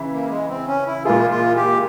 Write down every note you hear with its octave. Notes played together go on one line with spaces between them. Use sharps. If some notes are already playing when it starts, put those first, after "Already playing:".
Already playing: C#3 E3 E4
A#3
G#3
C4
C#4
E4
A#2 G#3 E4 F4 G#4
F4
G4